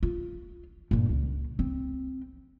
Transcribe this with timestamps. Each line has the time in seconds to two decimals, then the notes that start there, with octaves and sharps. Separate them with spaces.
0.03 F4
0.91 G2 A#2
1.09 C#2
1.59 C4